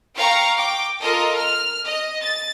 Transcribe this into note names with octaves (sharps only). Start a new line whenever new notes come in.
F5 G5 A#5 C#6
G5 D6
F4 A4 A#4 D#5
F6
D#5
A6